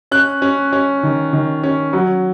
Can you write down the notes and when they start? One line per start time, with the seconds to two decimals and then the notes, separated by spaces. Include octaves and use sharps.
0.11 C#4 F#6
0.42 C#4
0.73 C#4
1.03 D#3
1.33 D#3
1.63 C#4
1.93 F#3